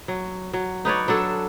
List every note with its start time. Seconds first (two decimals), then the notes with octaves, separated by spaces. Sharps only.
0.08 F#3
0.53 F#3
0.85 D#4 B4 C#5 D5
1.08 F#3 D4 A4